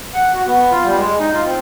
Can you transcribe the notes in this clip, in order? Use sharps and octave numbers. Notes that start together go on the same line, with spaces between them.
F#5
F#4
B3
F4
G3
G#3
D#4
F4
C4